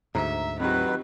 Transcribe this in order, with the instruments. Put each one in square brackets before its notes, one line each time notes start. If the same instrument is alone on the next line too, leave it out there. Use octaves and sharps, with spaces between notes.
[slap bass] D2 G#2 [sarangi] E5 [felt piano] A#5
[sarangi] D#3 [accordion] F#3 B4 [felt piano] C4 F4 G4